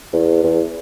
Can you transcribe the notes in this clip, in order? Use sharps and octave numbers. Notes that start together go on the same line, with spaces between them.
E2
E2